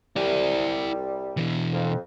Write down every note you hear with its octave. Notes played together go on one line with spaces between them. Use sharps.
C2 G3 E4 D5
B2 E3
F2